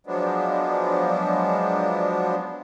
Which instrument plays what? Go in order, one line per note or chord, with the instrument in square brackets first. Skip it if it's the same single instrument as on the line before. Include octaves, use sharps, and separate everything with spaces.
[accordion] F3 F#3 G#3 B3 D4